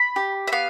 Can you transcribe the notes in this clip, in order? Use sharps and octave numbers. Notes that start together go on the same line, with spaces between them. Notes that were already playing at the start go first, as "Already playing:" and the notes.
Already playing: B5
G4
E5
B3 F5